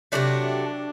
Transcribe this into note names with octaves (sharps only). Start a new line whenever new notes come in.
C3 D#3 F#3 A3 D4